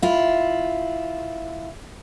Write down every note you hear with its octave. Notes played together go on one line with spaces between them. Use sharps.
E4 F4